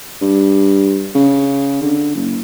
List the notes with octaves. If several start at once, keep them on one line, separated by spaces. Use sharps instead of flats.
G2
C#3
D3
F#1